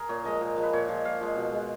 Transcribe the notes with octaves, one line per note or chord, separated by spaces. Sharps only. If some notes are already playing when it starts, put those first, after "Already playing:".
Already playing: G#4 A#4
A#2 C#5
F3 G#3 D#5
A#2
F3 G#3
B4
A#2 C#5
F3 G#3
A#2 F5
F3 G#3
B2
G#3